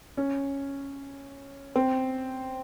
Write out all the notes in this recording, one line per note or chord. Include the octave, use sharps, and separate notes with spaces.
C#4
C4